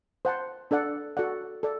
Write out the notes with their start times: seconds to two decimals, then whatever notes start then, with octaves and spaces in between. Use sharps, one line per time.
0.25 C5 F#5 A5 C6
0.71 D4 A4 D5 F#5
1.17 F#4 A4 D5 F#5
1.63 A4 D5